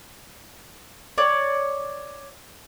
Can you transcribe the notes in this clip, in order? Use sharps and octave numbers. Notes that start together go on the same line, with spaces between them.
C#5 D5